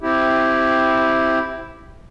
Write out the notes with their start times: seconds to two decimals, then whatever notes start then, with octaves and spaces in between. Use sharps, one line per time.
0.01 C4 E4 G4